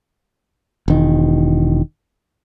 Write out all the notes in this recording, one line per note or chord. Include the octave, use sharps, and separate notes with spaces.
E1 D#3